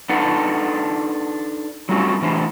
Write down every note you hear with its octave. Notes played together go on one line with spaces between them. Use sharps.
D4 D#4 A4 B4 F#5
F#3 G3 A3 C4 C#4 F#4
A2 E3 D4 C5